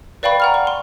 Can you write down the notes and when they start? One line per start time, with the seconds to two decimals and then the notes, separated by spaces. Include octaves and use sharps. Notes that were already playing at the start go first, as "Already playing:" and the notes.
0.23 B4 D5 F5 G5 B5 C#6
0.40 F#5 A#5 F6
0.54 C#6
0.67 C6